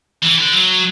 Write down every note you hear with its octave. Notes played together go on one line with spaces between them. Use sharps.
E3
D3
F#3